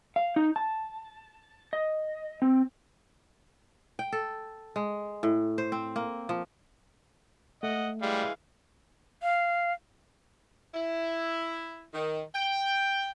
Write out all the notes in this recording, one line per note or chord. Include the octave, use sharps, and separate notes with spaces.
F5
D#4
A5
D#5
C4
G5
A4
G#3
A2
C5
C4
A#3
F3
A3 D#5 F#5
E3 G3 G#3 F5
F5
E4
D#3
G5